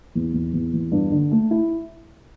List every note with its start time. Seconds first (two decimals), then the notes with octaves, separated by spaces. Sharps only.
0.15 E2
0.34 E2
0.53 E2
0.73 E2
0.92 G2
1.12 D3
1.31 A3
1.51 E4